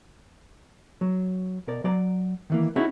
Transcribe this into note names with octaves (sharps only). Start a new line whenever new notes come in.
F#3
B2 A#4 D5
F#3 D5 A#5
D#3 E3 A#3
C#4 D#4 E4 F#4 G#4 C#5